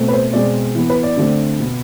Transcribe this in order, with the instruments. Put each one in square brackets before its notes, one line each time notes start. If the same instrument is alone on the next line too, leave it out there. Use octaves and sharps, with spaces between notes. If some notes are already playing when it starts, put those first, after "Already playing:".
Already playing: [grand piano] B2 A3 C4
B4
C5
B2 G#3 C4 D5
E3 B3
B4
D5
D3 A3 C4
B2 B3